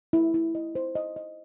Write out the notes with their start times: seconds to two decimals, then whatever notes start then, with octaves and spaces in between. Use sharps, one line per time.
0.13 E4
0.34 E4
0.55 D#5
0.75 C5
0.95 D#5
1.16 D#5